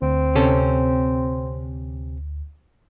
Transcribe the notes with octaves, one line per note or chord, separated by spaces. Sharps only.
D2 C4
C3 C#4 A4